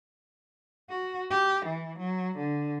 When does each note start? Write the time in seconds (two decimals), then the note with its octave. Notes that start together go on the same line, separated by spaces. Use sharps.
0.90 F#4
1.30 G4
1.65 E3
1.98 F#3
2.36 D3